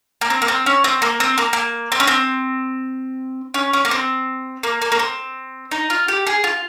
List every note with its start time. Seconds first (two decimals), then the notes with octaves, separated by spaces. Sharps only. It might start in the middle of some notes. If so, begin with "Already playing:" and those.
0.21 A#3
0.30 C4
0.42 A#3
0.48 C4
0.66 C#4
0.84 C4
1.02 A#3
1.20 C4
1.38 A#3
1.53 A#3
1.92 C4
2.00 C#4
2.07 C4
3.54 C#4
3.73 C#4
3.85 A#3
3.91 C4
4.63 A#3
4.82 A#3
4.92 A#3
4.99 C4
5.71 D#4
5.90 F4
6.08 G4
6.27 G#4
6.44 F4